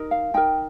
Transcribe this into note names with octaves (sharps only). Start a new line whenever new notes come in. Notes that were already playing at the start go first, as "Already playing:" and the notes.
Already playing: D#4 A#4
F5
D#4 A#4 G5